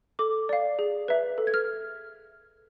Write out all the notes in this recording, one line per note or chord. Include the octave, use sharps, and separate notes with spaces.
A4 D6
D5 F5
G#4
B4 E5
A4
G#6
F6